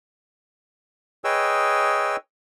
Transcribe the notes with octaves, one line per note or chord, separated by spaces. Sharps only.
G#4 B4 C#5 D#5 G5 E6